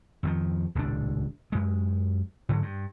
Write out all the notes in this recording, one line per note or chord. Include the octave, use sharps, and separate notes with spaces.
F2 D#3 F3
D#1 C#2 A2 D4
F#2 G#3
G#2 D3 F#3
G2